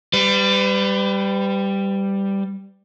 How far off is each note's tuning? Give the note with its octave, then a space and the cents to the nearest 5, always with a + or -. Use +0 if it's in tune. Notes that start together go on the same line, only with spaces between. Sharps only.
G3 +5 B4 +40